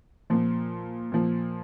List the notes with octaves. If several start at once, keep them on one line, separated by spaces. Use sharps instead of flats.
A#2 F3
A#2 F3